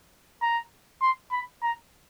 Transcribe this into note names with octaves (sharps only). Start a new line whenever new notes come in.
A#5
C6
B5
A#5